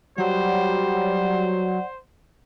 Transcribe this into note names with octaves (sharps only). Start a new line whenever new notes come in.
F#3 G3 C5 D5 F#5